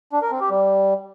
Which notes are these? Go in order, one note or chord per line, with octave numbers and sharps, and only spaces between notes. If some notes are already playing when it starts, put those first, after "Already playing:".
D4
A#4
C4
G4
G3